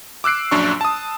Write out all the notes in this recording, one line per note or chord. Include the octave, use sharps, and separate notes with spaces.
D6 E6 F#6 C7 D7
A#1 F#2 D4 C#6
A5 D#6